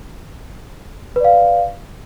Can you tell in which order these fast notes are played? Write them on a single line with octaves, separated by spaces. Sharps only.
B4 D5 F5